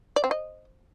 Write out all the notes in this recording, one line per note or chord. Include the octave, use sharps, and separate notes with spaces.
D5
C4
D#5